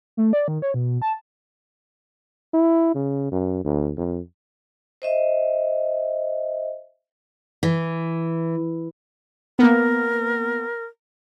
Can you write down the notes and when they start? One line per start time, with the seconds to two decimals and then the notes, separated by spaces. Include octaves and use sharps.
0.17 A3
0.33 D5
0.48 D#3
0.62 C#5
0.74 B2
1.02 A5
2.54 E4
2.95 C#3
3.31 F#2
3.64 D2
3.98 F2
5.02 C5 D#5 E5
7.63 E3
9.59 A#3 B3 A#4